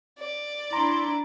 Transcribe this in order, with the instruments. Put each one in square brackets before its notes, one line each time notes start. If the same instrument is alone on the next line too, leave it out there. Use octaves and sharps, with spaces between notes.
[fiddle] D5
[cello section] D4 E4 [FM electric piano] A#5 [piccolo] C6